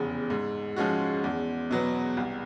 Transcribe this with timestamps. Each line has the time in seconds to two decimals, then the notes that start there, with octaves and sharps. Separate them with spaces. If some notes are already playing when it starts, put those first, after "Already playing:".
Already playing: F1 E2 C#3
0.30 G#2
0.76 F3 G#3 C#4 F#4
1.24 E2
1.71 B2 F#3 B3
2.17 C2